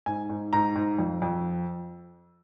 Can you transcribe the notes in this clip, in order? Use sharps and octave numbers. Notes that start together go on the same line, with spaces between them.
G#2 G#5
G#2
G#2 A#5
G#2
F2
F2